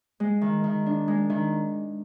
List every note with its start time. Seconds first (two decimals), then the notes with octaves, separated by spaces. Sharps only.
0.20 G#3
0.41 D#3
0.64 D#3
0.86 D4
1.08 G#3
1.30 D#3